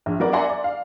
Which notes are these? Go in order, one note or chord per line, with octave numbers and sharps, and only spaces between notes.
A#1
F#3 B3 A#4 D5
D5 E5 F#5 G#5 A#5 C6
D5
F5